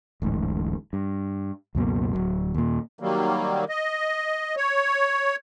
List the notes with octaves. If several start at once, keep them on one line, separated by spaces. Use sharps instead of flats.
D1 A1 G#2
G2
C#2 F#2 B2 A#3
D1 A#1 F#3
D#2 A#2
D#3 F#3 G3 A#3
D#5
C#5